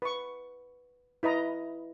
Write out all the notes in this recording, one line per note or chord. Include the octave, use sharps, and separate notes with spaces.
B4 C#6
E4 B4 D#5 A#5